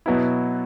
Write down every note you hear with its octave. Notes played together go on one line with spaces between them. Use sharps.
B2 F#3 B3 E4